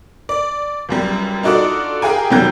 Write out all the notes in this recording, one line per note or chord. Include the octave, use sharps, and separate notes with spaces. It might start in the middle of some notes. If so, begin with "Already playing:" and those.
D5
C#2 F#2 G3
D4 D#4 F4 F#4 A4 D5
G4 G#4 A#4 F5 G5 G#5
F1 D#3 F#3 G3 G5 G6